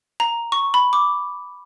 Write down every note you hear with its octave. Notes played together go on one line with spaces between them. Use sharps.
A#5
C#6
B5
D6